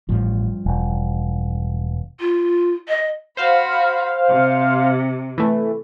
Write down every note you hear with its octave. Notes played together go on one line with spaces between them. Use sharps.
A1 G2 F3
E1
F4
D#5
F#4 C5 F5 B5
C3
E3 A3